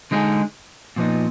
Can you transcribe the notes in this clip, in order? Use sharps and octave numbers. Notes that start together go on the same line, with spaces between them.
D3 G#3 D#4 G#4
A#2 F3 B3 D#4